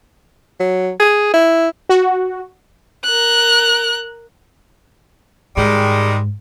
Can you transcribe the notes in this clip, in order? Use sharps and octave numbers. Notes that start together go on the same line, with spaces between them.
F#3
G#4
E4
F#4
A#4 F#6
G#2 D#3 G3 G#3